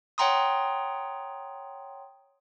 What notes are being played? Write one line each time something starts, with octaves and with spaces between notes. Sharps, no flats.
C#5 F#5 G5 A#5 C6 D#6